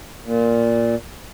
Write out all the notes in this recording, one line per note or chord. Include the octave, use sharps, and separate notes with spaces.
A#2